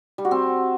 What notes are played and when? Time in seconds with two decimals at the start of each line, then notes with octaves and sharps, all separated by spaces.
0.18 G3
0.25 F#4
0.31 C4